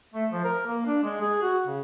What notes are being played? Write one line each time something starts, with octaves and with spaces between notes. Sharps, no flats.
A3
F3
A#4
A#3
D4
G#3
G#4
F#4
C#3